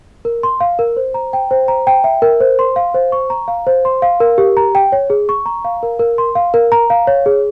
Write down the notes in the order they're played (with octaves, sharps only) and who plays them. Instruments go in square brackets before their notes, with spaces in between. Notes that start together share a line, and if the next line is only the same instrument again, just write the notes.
[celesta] A#4
C6
F5
A#4
C5
A#5
G5
C5
A#5
G5
E5
A#4
C5
C6
F5
C5
C#6
A#5
F5
C5
C6
F5
A#4
G4
A#5
G5
C#5
G#4
C#6
A#5
F5
A#4
A#4
C6
F5
A#4
A#5
F5
C#5
G#4